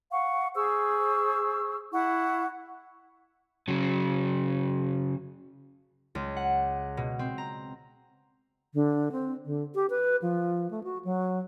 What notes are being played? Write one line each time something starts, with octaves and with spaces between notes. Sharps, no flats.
F5 F#5 C#6
G#4 C5 C#6 E6
E4 F#5 C#6
C#3 F#3
C#2
F#5
B2
C4
A#5
D3
C4
D3
G4
B4
F3
A3
F#4
F#3